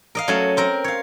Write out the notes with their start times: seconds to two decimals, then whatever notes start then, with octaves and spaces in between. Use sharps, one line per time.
0.15 A#4 D#5 F5
0.28 F#3 A3 C#4 C#5 A5
0.57 C4 A#4
0.84 C#5 F5